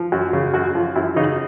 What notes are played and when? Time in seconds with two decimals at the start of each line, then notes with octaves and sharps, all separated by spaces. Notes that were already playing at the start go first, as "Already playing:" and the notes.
Already playing: F3
0.12 F#2 F#4
0.33 C#3
0.54 F#2 F#4
0.75 F3 F4
0.96 F#2 E4
1.16 C#3 D#4